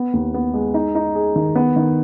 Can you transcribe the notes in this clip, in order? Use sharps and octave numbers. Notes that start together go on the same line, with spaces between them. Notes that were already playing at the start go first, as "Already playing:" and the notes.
Already playing: B3
D#2
B3
G#3
D#4
D#4
G#4
D#3
B3
D#3